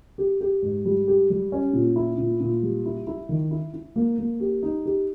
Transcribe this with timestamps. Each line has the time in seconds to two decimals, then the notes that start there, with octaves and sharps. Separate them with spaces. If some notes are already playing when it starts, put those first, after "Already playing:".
0.18 G4
0.41 G4
0.62 G#2
0.85 G3
1.08 G4
1.30 G3
1.52 C#4
1.73 A#2
1.96 E4
2.18 A#2
2.40 A#2
2.62 G3
2.86 E4
3.07 E4
3.29 D#3
3.51 E4
3.73 E4
3.96 A#3
4.19 A#3
4.40 G4
4.63 D#4
4.86 G4